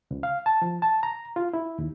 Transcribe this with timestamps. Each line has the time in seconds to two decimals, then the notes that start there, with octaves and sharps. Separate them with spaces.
0.11 C#2
0.23 F5
0.46 A5
0.62 F3
0.82 A5
1.03 A#5
1.36 F4
1.53 E4
1.78 D#2